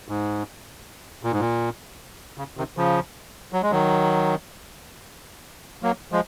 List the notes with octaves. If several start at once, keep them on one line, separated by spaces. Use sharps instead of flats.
G#2
A#2
G#2
A#2
C#3
C3 D#3
C#3 F3
F#3
G#3
D#3 F#3
F#3 A#3
F3 G#3